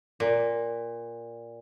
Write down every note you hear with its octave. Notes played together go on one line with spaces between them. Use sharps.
A#2